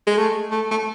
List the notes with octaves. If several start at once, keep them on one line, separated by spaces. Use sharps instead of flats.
G#3
A3
A3
A3